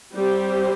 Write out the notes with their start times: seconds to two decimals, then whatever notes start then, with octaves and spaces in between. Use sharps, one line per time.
0.14 G3 C4 G4 C5